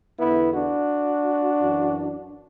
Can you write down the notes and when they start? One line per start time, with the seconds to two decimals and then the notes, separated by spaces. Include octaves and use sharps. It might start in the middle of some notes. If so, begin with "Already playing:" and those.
0.18 E2 D3 B3 E4
0.54 D4 F#4
1.60 F#2 E3